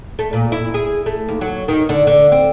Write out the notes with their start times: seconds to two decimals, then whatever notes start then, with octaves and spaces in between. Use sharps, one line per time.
0.19 A3
0.33 A#2
0.52 E4
0.74 G#4
1.06 A3
1.29 D#2
1.41 F#3
1.68 D#3
1.89 D3
2.07 D3
2.32 C4